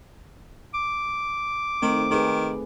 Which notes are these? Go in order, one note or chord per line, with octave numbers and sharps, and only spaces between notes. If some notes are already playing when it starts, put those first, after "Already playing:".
D6
D#3 A3 C4 D#4
D#3 G4 G#4 B4